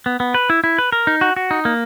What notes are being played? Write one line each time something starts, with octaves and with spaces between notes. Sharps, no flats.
B3
B3
B4
E4
E4
B4
A#4
D#4
F#4
F#4
D#4
A#3